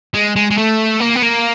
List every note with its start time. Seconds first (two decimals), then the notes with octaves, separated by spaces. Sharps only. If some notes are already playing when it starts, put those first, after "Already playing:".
0.14 G#3
0.36 G#3
0.51 G#3
0.58 A3
1.00 A#3
1.16 B3
1.23 A#3